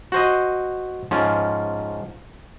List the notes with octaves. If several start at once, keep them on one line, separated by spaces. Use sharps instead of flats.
F#4 C5 D#5
G#2 F3 C#4